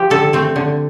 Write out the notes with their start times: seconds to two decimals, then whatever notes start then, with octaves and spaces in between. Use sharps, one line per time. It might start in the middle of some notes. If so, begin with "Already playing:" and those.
Already playing: F3 G4
0.10 D3 A4
0.33 A3 C4
0.56 D3